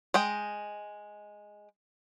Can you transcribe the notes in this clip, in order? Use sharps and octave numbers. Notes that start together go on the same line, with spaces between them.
G#3 D#5 G5